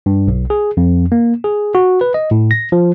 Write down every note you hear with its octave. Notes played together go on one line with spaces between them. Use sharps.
G2
B1
G#4
F2
A#3
G#4
F#4
B4
D#5
A2
A#6
F3